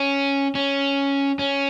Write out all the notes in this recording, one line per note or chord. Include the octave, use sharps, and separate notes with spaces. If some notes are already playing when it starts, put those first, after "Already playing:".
Already playing: C#4
C#4
C#4